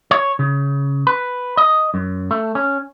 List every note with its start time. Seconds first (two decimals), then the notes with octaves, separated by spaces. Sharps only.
0.11 C#5
0.39 C#3
1.07 B4
1.57 D#5
1.94 F#2
2.31 A3
2.55 C#4